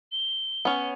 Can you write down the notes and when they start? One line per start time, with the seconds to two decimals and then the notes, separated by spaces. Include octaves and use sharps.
0.12 G7
0.65 B3 C#4